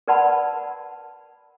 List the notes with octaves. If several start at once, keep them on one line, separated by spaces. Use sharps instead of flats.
A#4 B4 D5 F#5 A5 B5